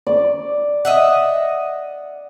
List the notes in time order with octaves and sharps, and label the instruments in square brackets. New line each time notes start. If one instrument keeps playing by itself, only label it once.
[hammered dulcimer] D5
[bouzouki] D#5 E5 F#5